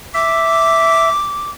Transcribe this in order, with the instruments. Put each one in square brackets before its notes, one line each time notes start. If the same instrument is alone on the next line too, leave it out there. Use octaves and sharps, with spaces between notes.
[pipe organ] E5 [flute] D6